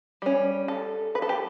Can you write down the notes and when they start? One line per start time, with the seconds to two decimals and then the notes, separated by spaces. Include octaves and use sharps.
0.22 G3 C#4
0.68 A4
1.15 B4
1.22 A4
1.29 G4